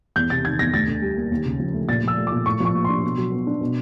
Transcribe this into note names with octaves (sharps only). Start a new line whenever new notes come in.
E2 G6
C3 A6
D#3 G#6
E2 A#6
D2 A6
D3
G3
A#3
D#2
C#3
F3
A3
A#2 A6
F3 E6
A3
A#2 D6
A2 C#6
F3 C#6
A#3
D4 C6
B2
F#3
B3
D4
B2